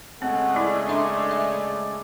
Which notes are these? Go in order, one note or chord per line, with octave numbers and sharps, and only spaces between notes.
C#3 G#3 A3 C4 F#5
E4 G#4 D5
D4 D5 E5 C6
E5